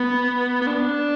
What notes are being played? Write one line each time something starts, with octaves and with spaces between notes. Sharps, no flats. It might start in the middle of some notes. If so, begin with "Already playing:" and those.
Already playing: B3
B3
D4